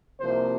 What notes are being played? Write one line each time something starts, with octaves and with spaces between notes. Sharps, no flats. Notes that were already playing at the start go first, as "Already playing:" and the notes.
C2 C3 F3 A#3 C5